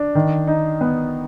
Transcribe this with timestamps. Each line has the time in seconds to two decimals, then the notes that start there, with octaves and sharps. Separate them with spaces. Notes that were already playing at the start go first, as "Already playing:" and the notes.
Already playing: D4
0.15 D#3
0.47 D#4
0.81 B3